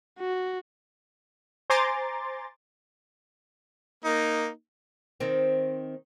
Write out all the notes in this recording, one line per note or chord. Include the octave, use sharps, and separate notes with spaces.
F#4
C5 G#5 A#5 C6 D6 A6
A#3 D#4
D#3 C4